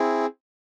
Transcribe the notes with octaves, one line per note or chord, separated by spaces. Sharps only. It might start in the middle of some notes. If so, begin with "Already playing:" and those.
Already playing: C4 E4 G#4